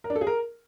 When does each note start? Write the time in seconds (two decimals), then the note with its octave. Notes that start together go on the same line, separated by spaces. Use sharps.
0.04 A#4
0.10 D4
0.16 A4
0.21 G#4
0.27 A#4